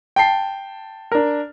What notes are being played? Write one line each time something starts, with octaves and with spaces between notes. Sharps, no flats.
G5 A5 C7
D4 A#4